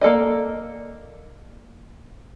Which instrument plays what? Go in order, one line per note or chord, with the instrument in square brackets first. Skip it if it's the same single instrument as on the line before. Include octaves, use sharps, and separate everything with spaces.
[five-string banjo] A#3 A4 D5 D#5